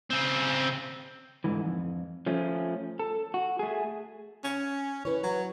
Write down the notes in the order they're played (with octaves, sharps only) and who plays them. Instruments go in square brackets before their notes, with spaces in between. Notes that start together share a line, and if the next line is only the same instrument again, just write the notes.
[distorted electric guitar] C#3 C4
[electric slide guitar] G#2 D3 E3
F2
F3 A3 C#4
A4
F#4
A3 G#4
[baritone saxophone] C#4
[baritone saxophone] E3 [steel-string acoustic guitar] B4 C#5
[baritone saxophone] F#3